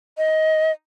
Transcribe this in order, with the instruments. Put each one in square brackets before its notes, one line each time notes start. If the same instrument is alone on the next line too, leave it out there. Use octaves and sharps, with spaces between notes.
[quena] D#5